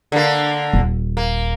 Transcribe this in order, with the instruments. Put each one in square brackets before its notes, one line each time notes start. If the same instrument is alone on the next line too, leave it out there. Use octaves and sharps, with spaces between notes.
[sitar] D3 A#3
[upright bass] D#1
[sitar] A#3